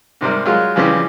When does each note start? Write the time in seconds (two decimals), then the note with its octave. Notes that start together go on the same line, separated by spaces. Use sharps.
0.21 G#2 C3 G3 A#4
0.46 F#3 G#3 F4
0.76 F2 C#3 E3 G3 G4